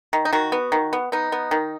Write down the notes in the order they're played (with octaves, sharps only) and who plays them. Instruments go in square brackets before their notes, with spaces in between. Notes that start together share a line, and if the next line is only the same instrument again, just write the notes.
[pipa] D#3
D#4
D#3 F#4
B3
D#3
B3
B3 D#4
B3
D#3